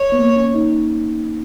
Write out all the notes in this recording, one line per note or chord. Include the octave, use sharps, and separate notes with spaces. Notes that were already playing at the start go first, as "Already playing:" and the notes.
Already playing: C#5
B3
A#3
C#4
D#4